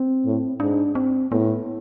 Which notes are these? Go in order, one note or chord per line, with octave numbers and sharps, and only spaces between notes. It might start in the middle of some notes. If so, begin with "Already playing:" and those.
Already playing: C4
A2
G#2 D4
C4
A2 B3